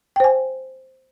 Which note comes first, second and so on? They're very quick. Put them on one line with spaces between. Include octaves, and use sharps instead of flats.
G5 C5 G#5